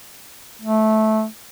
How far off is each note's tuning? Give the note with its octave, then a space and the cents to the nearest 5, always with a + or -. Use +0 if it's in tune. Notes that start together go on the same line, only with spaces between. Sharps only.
A3 -15